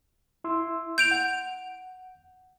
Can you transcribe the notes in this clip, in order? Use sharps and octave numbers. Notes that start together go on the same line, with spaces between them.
E4 C6 E6
G6 D7 F7
F#5